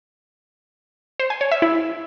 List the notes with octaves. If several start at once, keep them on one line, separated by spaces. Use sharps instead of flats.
C5
G#5
C#5
E5
E4